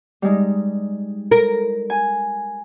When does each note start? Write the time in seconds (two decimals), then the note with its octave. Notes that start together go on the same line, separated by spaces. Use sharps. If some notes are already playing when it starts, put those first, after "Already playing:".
0.22 G3 G#3 D#4
1.31 A#4
1.90 G#5